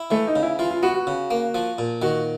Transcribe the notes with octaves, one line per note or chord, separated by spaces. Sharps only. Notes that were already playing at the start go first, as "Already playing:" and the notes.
Already playing: E4
E3 A3
D#4
C#3
E4
E3 F4
F4
B3 F#4
F#4
C#3
A#3
F3
A#2
D#3 F#4